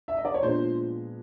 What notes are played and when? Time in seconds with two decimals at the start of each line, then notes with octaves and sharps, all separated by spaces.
0.08 E5
0.17 D#5
0.25 D5
0.34 C#5
0.42 A#2 F3 G#3 B3 D4 C5